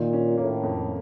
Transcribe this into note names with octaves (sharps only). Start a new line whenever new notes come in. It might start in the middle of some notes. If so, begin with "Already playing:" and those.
Already playing: A#2 D#3
C#4
A2 A#3
F2